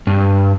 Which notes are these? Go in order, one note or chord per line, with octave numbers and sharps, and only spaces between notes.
G2